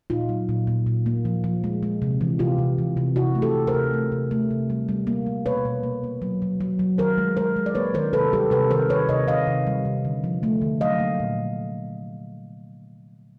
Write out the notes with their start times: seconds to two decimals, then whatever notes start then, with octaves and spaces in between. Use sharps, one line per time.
0.10 A#2 D#4 F4
0.29 F#3
0.49 A#2
0.67 A#2
0.87 A#2
1.06 A#3
1.25 F3
1.44 F3
1.64 G#3
1.83 G#3
2.02 C3
2.21 E3
2.39 C3 F4 G4
2.58 C3
2.78 E3
2.97 C3
3.16 C3 E4 F#4
3.35 A3
3.42 G4 A4
3.54 C3
3.67 A#4 C5
3.74 C3
3.93 A3
4.12 C3
4.31 A3
4.51 C3
4.70 G3
4.89 G3
5.07 A#3
5.26 G3
5.46 B2 B4 C#5
5.65 B2
5.83 A#3
6.04 A#3
6.22 F#3
6.42 F#3
6.61 F#3
6.79 F#3
6.98 D#3 A#4 C5
7.18 G#3
7.37 G#3 A#4 C5
7.56 G#3
7.66 D5
7.75 A#3 B4 C#5
7.94 D#3 A#4 C5
8.13 C3 A4 B4
8.33 G3 G4 A4
8.51 C3 A4 B4
8.70 D#3 A#4 C5
8.89 D#3 B4 C#5
9.09 C3 C#5 D#5
9.28 D#3 D#5 F5
9.47 C3
9.67 G3
9.85 C3
10.05 D3
10.24 F3
10.43 A3
10.62 D3
10.81 F#3 D#5 F5
11.00 A#3
11.20 A#2